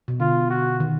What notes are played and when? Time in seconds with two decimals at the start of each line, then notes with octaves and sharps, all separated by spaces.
0.08 B2
0.20 D3 F4
0.50 F#4
0.80 D#3